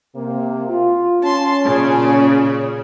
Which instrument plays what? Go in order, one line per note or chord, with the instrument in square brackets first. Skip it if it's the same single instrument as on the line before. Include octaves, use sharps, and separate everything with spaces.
[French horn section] C3 A#3
F4
[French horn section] C#4 [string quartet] A5 C6
[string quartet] A#2 C#3 G#4